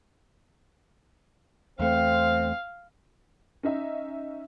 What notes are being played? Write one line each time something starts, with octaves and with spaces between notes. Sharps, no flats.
E2 A3 C4 F5
C#4 D#4 E5